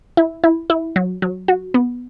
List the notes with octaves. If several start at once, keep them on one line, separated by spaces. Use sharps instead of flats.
E4
E4
E4
F#3
F#3
F#4
B3